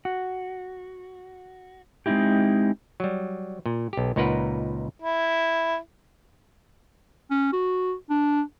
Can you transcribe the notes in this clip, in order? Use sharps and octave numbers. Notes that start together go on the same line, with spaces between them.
F#4
G#3 C4 C#4 D#4 E4 G4
F#3 G3
A#2
B1 G4
C#2 A#2 D#4 A#4 B4 F#5
E4
C#4
F#4
D4